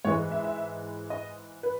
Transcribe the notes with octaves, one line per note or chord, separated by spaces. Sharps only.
G#2 E3 G#3 C#5
E5
E5
D#5
B4